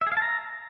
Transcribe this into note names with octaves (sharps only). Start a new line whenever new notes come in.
E5
G#4
F5
A5
A#5